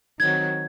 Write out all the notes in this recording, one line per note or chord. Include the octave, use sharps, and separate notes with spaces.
D#3 F#3 C4 F#4 G#6